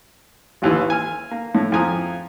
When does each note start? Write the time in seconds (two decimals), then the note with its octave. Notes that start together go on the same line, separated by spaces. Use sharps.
0.62 A1 D#2 E3
0.90 G#5 F6
1.31 A#3
1.55 A2
1.72 F2 E4 G#5 A#5 D#6